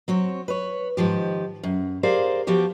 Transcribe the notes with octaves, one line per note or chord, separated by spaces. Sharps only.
F#3 C4 C#5
B4 C#5
G#2 D#3 F3 G4
F#2
G4 G#4 A#4 C5 D5 F5
F3 B3 F#4 G4 G5